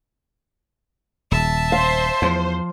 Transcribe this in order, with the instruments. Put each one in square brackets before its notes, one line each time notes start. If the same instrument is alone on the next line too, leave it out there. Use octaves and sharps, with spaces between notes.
[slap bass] D#1 [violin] E5 A5
[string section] C5 [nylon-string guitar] F5
[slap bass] E2 [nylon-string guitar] F3